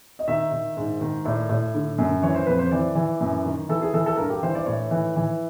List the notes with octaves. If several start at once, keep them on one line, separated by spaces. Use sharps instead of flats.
D#5
D#3 E5
D#3
G#2
D#3
A2 D5
A2
D3
F#2
E3 C#5
C5
F2 B4
C5
E3 D5
E3
F#2
D#3
E3 A4
G#4
E3 A4
A4
G2 A#4
G4
E3 C5
D5
A2 C#5
E3
E3